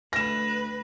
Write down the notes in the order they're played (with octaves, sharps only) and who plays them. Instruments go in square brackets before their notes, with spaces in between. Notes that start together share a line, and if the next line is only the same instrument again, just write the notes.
[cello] D2 B4 [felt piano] A#6 E7